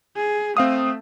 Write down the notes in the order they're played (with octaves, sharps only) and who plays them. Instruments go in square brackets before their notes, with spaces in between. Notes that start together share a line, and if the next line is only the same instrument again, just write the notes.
[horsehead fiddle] G#4
[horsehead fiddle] A3 [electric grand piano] C4 F5 D#6